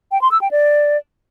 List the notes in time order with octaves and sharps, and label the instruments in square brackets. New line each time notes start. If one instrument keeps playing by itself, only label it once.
[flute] G5
C6
E6
G5
D5